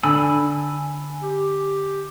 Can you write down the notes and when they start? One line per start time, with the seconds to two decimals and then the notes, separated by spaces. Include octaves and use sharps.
0.03 D3 G#5 B5 E6
1.22 G4